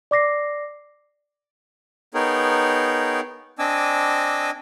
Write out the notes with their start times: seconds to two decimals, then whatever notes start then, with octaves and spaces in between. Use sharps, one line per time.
0.11 D5 D6 A#6 C7
2.14 B3 D#4 G#4 A#4 C#5 G5
3.59 C4 D4 D#5 G#5 D6 E6